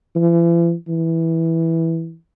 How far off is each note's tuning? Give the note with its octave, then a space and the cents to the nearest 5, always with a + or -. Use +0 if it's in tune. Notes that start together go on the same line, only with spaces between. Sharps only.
E3 +45
E3 -5